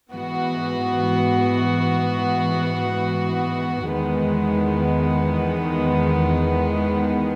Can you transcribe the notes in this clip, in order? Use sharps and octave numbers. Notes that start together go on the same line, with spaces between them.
G#2 E3 B3 F#4
E2 D#3 G#3 B3